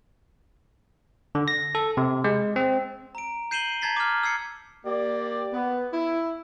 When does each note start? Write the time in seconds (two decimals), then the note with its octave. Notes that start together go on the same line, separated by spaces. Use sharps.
1.35 D3
1.48 A#6
1.75 A4
1.97 C3
2.24 G#3
2.56 C4
3.15 A#5 D7
3.51 G6 C7 D#7 E7 F#7 G7
3.81 A5 A#5 G#6 A6 B6 C7
3.96 D6 F6
4.23 E6 G#6 C7 C#7
4.86 A#3 G4 D5
5.53 B3
5.93 E4